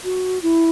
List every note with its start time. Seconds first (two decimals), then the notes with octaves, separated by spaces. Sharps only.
0.04 F#4
0.42 E4